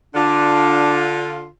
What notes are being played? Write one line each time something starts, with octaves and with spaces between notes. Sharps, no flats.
D3 D4 F4